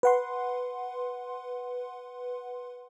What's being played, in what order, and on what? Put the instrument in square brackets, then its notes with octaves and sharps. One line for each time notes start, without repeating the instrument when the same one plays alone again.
[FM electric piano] B4 F#5 C6